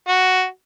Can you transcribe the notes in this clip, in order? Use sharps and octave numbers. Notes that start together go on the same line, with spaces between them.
F#4